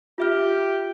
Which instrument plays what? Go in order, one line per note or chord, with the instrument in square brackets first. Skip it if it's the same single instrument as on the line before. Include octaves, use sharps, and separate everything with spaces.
[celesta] F4 E5 F6 [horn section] G4